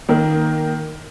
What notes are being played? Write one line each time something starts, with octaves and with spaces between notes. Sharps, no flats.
D#3 A#3